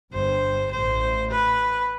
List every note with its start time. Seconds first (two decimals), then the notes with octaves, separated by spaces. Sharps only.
0.14 G1 G2 C5
0.71 A1 A2 C5
1.31 B4